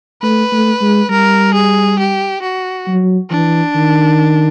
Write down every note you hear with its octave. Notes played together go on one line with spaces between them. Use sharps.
A3 B4
A3
G#3
G3 A#4
G#4
G4
F#4
F#3
E3 D4
D#3